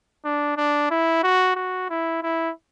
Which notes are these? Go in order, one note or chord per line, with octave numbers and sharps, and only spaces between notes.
D4
D4
E4
F#4
F#4
E4
E4